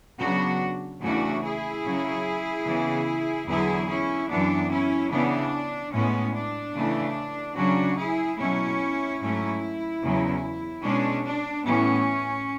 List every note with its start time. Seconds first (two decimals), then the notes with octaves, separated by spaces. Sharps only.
0.20 C#3 F#3 B3 D4 F#4
1.02 E2 C#3 E3 A3 C#4 D4 F#4
1.43 E4 G#4
1.84 C#3 F#3 C#4
2.65 C#3 E3 B3
3.47 E2 D3 F#3 B3 E4 G#4
3.88 C#4 E4
4.29 F#2 E3 B3 D4
4.70 C#4 E4
5.11 C#3 E3 B3 D4
5.92 A2 G#3 B3 C#4
6.34 D4
6.75 C#3 E3 A3
7.56 C#3 F#3 C#4 D4 F#4
7.98 E4 G#4
8.38 B2 F#3 A3 C#4 E4
9.21 G#2 F#3 A3 C#4
10.02 E2 C#3 F#3 C#4
10.84 B2 G#3 C#4 D4
11.24 D4
11.66 A2 E3 B3 C#4